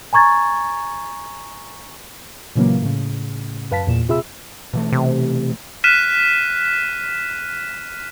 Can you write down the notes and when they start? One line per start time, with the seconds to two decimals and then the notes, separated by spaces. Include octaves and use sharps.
0.13 G#5 A#5 C#6 G#6 A6
2.55 A#2 C#3 E3 F#3 A#3
2.82 A2 C#3
3.71 F#2 B4 F5 A5 B6
3.87 E2 A#2 E7
4.09 C3 F4 G#4 E5 B5 E6
4.73 B2 E3 A3
4.93 C3
5.84 F6 F#6 B6 D#7 E7